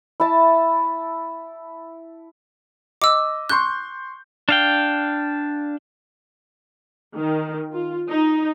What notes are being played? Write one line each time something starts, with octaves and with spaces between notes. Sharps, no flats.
E4 A5
D#5 D6 E6
C6 C#6 F#6 G6
D4 F5 G5
D#3
F4
D#4